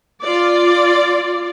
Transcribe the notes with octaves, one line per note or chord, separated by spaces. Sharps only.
F4 D5